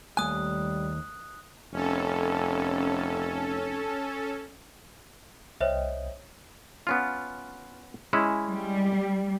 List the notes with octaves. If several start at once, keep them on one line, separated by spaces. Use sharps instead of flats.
D#2 G3 A3 G#5 D#6 F#6
F1 C#4 A4
C2 C5 C#5 D#5 E5 G5
B3 C#4 F4
G#3 C#4 E4
G3